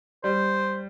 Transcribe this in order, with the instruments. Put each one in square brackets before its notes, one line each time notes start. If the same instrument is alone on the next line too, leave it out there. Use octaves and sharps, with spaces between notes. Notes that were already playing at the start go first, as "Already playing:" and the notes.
[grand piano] G3 [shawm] C5